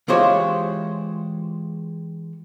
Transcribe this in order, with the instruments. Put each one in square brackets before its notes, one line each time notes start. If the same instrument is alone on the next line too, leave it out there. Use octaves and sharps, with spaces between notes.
[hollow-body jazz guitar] E3 G#3 F4 G4 C5 C#5